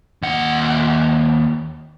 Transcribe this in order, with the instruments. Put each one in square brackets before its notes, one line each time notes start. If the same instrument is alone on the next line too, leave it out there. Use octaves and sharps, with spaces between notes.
[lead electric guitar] D#2 F#5